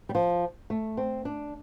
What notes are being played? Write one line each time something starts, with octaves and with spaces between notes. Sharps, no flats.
G3
F3
A3
C4
D4